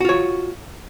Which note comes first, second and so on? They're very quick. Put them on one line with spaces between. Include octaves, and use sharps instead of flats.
F#4 F4 C#5